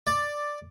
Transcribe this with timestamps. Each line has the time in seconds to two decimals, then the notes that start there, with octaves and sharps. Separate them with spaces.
0.07 D5